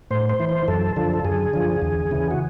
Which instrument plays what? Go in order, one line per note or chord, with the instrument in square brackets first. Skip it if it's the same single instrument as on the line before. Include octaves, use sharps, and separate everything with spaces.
[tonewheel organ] A2 C5
C5
E3
C5
F#2 A4
D3 F3 A4
A4
F#2 G#4
D3 F3
E2
C#3 E3
F#4